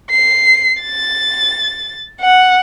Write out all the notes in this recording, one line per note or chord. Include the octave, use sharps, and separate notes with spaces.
C7
A6
F#5